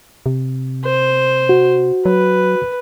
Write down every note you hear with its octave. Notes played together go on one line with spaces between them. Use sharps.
C3
C5
F#4
F#3 B4